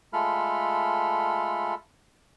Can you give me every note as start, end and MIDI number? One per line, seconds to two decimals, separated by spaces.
0.13 1.74 56
0.13 1.74 57
0.13 1.74 65
0.13 1.74 69
0.13 1.74 83
0.13 1.74 89